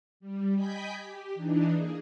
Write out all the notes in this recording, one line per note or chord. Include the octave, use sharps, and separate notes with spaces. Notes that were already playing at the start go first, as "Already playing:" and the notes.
G3
D#5 G5 G#5 B5 G6 B6
G4
E3 D4 D#4
A#3 G#4